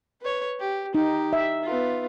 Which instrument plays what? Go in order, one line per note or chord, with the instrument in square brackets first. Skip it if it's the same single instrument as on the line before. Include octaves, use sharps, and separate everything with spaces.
[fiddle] B4 C#5
G4
[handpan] D#4 [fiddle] G4
[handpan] E5
[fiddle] B3 F4